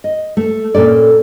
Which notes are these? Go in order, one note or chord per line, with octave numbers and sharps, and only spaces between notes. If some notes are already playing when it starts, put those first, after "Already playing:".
D#5
A3
A#2 C#4 A4 D5